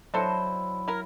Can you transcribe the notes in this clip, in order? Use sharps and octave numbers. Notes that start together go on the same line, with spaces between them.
F#3 D4 E4 A4 C5 D#5 A5
E4 A#4